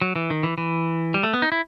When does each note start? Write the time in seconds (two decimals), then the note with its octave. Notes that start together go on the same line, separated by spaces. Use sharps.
0.02 F#3
0.16 E3
0.30 D#3
0.43 E3
0.58 E3
1.14 G3
1.23 A3
1.34 B3
1.42 D#4
1.52 E4